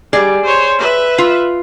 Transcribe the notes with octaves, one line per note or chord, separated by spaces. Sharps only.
G3 G#4 D5
C5 C#5
B4 E5
F4